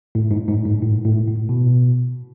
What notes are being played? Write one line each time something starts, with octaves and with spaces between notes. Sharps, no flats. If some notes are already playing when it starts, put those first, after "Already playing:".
A2
G#2
G#2
G#2
A2
A2
A2
B2